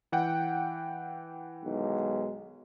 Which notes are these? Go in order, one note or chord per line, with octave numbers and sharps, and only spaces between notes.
E3 F#5 G5
B1 D#3 G#3